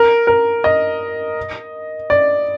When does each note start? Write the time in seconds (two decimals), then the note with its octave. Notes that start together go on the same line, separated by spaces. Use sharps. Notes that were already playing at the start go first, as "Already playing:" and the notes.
Already playing: A#4
0.27 A#4
0.64 D#5
2.10 D5